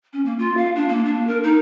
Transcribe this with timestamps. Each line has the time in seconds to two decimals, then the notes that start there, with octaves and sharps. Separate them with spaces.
0.13 C#4
0.25 A#3
0.39 F4
0.57 F5
0.76 D4
0.89 A#3
1.05 D4
1.27 A#4
1.43 D#4